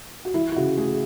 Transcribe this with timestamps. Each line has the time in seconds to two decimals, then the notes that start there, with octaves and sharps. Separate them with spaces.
0.25 F#4
0.34 E3 E4
0.52 E4
0.56 C#3 F#4
0.77 A3 G#4